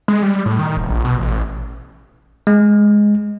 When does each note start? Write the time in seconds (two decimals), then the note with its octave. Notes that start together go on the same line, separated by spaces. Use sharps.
0.08 G#3
0.22 G3
0.46 A2
0.59 D#3
0.77 E1
0.89 A#1
1.05 B2
1.18 A1
2.47 G#3